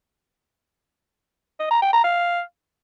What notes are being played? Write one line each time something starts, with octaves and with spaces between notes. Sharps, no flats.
D#5
A#5
G5
A#5
F5